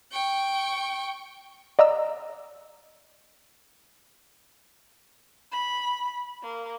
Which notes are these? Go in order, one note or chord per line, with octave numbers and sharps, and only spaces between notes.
G5 C#6
D5 D#5 A#5 E6
B5
A#3